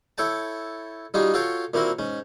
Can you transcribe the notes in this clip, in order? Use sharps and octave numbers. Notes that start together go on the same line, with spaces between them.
E4 A4 C#5 G5 A5
G3 D#4 F4 F#4 G#4
F4 F#4 A4 C#5 F5 G5
A#2 A#3 C4 E4 F#4 A#4
G#2 C#4